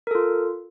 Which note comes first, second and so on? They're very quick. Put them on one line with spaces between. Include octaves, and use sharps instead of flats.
A#4 A4 F4